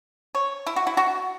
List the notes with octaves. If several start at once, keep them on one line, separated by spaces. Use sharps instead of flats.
C#5
E4
F#4
E4
F#4